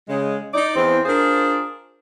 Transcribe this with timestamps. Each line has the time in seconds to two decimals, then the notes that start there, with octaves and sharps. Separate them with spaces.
0.09 C#3 G#3
0.53 D#4 D5
0.76 E2 C4
1.05 D4 F4 G#4 A#4 C5